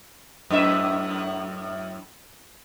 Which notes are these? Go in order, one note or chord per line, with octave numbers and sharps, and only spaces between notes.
F#2 A2 E5